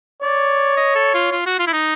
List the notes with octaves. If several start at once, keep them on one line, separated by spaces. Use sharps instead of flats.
C#5 D5
D#5
A4
F4
F4
F#4
F4
E4
D#4